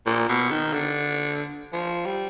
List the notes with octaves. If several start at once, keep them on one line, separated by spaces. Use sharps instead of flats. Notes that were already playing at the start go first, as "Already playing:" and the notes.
A#2
B2
D#3
D3
F3
G3